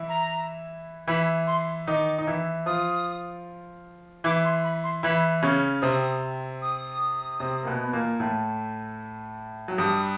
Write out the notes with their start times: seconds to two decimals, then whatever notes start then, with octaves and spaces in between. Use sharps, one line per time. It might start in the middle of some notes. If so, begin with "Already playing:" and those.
Already playing: E3 E4
0.09 A#5
1.08 E3 E4 B5
1.47 C6
1.87 D#3 D#4 D6
2.19 D#4
2.27 E3 E4
2.66 F3 F4 D#6
4.24 E3 E4 D6
4.45 C6
4.64 B5
4.84 C6
5.03 E3 E4 B5
5.43 C#3 C#4 C#6
5.82 C3 C4 D#6
6.62 D#6
7.40 C3 C4
7.63 A#3
7.67 B2 B3
7.84 B3
7.93 A#2 A#3
8.20 A2 A3
9.68 F#3
9.78 G2 G3 D#6